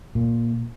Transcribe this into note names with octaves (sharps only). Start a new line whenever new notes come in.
A#2